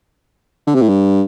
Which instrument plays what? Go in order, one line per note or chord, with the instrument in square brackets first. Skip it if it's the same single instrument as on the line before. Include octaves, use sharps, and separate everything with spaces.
[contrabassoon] D3
C3
A2
G2